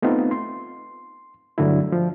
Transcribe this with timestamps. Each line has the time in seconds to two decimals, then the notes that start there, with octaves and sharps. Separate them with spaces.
0.02 A3 B3 C4 D#4 F4
0.31 C6
1.58 G2 D3 F#3 A3 E4
1.92 F3